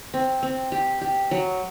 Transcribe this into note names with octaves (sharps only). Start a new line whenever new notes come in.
C4
C4
G4
G4
F#3